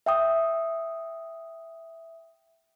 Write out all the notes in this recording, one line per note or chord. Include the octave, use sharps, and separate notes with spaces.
E5 G5 D#6